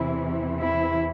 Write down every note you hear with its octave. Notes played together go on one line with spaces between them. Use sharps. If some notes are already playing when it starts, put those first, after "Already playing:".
Already playing: E2 C3 E3 E4
E4